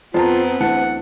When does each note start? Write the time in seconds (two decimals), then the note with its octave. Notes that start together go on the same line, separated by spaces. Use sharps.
0.14 F2 B3 C4 F4 A5 A#5
0.60 D2 E3 F#5 A5